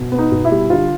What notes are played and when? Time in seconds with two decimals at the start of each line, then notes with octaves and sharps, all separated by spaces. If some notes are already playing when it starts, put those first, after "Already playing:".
Already playing: B2
0.12 B3
0.19 D#4
0.32 B2
0.45 E4
0.51 G3
0.70 D3 F4